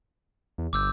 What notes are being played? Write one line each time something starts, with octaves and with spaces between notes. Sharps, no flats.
E2
G1 D6 E6 G6